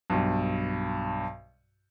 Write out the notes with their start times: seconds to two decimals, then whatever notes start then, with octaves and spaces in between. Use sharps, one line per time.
0.10 B1 G2